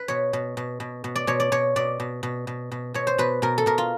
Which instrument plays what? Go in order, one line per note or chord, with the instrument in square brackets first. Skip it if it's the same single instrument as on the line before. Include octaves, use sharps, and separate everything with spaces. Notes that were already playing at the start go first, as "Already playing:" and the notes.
Already playing: [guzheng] B4
B2 C#5
B2
B2
B2
B2
D5
B2 C#5
D5
B2 C#5
B2 D5
B2
B2
B2
B2
B2 C#5
C5
B2 B4
B2 A#4
A4
B2 A#4
F4